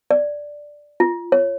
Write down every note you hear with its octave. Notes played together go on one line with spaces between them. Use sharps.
D5
F4
C#5